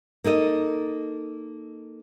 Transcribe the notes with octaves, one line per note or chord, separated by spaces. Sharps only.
A#3 D#4 A4 D#5